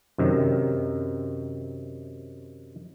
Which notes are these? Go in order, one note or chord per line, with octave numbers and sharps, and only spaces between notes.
F#2 C3 D#3